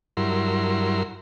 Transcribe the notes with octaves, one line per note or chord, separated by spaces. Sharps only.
G2 F#3 E4 A#4 C6